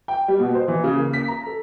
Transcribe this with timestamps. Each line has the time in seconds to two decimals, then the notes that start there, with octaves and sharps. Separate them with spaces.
0.08 G5
0.28 G3
0.40 B2
0.55 C5
0.68 E3
0.84 C#3
0.98 A#3
1.13 B6
1.28 A#5
1.46 A4